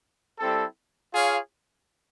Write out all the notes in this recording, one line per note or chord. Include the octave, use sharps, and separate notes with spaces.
G3 C4 E4 A4
F4 G#4 C#5 F5